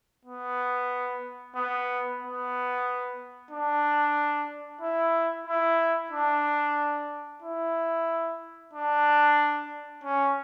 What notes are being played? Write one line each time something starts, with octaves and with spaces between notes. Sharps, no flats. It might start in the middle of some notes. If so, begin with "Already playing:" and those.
B3
B3
B3
D4
E4
E4
D4
E4
D4
C#4